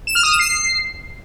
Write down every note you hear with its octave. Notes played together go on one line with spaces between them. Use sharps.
E7
F6
D#6
E7
C7